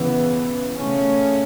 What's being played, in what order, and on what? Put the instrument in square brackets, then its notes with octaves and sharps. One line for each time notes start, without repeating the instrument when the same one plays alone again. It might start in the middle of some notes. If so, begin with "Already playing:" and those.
Already playing: [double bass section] C#3 E3 B3
C#3 A3 C#4